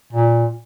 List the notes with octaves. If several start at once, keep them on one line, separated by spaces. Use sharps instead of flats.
A#2